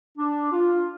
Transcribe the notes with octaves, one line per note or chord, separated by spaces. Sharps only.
D4
F4